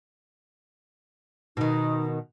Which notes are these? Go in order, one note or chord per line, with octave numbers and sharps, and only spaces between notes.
B2 D#3 D#4